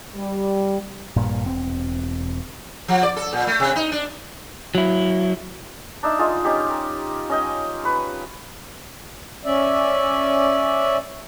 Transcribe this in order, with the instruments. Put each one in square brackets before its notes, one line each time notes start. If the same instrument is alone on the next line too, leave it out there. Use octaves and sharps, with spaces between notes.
[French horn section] G3
[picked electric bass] A#1 G2 A#2
E1 C4
[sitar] F3
D5
A4
A#2
A3
C3
D#4
D4
[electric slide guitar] F#3 E4
[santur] D4 D#4 E5
G#3 F4 G#4
C#4 D#4 G4
A#4
C#4 D#5 G5
B4 C#5
[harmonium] C#4 D5 E5